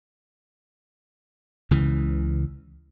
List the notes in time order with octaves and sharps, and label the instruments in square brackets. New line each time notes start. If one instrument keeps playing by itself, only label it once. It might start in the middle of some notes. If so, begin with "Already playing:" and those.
[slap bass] C#2 C#3 E3